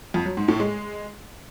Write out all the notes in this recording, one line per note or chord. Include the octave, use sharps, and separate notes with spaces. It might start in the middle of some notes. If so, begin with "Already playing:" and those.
F2
F#3
G#2
A2
G#3